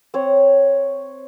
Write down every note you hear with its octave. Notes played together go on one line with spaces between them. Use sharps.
C4 C#5